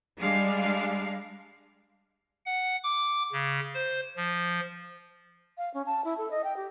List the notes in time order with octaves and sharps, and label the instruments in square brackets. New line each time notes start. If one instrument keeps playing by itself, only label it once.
[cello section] G3 G#3 D4 F5
[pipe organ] F#5
D6
C#3
C5
F3
[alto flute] F5
C#4
A5
E4
A4
D#5
G5
G4